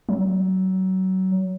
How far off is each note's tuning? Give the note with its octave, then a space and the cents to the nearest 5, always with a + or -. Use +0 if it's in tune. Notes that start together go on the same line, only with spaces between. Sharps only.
F#3 +25